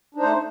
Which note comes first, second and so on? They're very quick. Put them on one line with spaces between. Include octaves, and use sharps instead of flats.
D4 D#4 C5 A3